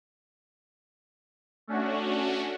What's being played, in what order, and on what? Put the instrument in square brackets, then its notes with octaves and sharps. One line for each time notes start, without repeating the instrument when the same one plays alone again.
[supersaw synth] A3 C#4 D4 F#4